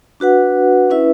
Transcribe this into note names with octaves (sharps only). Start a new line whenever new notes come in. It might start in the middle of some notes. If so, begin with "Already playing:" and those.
D4 F#4 B4 F#5
C#4 E4 B4 E5